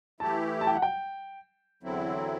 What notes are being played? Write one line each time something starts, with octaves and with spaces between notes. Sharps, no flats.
E3 A3 E4 G4 A5
A5
G5
F#5
G5
E2 D3 F#3 C4 E4